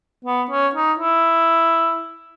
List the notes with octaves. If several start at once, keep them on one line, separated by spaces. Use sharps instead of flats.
B3
C#4
D#4
E4